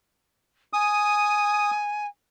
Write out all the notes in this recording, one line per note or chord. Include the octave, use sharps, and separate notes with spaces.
G#5 D#6